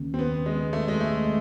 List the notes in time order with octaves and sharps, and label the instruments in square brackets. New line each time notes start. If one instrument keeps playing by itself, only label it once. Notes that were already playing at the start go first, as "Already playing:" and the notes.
Already playing: [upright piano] D#2 C#3
[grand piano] C4
B3
G#3
A3
G#3
A3